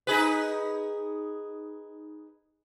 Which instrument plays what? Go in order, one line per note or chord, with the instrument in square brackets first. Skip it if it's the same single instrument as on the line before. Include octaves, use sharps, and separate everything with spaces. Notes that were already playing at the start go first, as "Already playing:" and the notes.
[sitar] D#4 G#4 B4